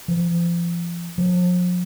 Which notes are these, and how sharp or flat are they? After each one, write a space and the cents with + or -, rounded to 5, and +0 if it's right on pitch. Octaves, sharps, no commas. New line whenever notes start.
F3 -30
F3 +40